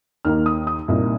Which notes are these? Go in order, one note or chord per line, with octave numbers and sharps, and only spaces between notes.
D#2 D#3 A#3 D#4 F6
D#6
D#6
C2 A#2 A#3 D#4